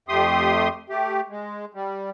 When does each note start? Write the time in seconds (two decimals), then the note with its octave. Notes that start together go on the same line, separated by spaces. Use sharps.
0.08 F2 A3 G4 C6 D#6
0.90 A3 G4
1.29 G#3
1.74 G3